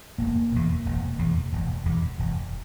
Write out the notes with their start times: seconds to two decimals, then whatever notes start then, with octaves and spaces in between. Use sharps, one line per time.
0.18 E1 A#3
0.52 E2 B2
0.86 E1
1.19 E2 B2
1.52 E1
1.85 E2 B2
2.19 E1